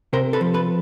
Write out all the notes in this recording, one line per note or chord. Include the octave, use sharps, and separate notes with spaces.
C3 A#4 C5
A4 B4
F3
A4 B4